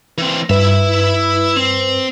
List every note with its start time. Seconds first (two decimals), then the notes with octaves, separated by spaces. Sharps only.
0.18 E3 C4
0.50 G2 E4 B4 E5
1.56 C4